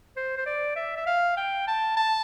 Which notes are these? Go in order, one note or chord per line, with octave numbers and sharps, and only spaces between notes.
C5
C5
D5
E5
E5
F5
G5
A5
A5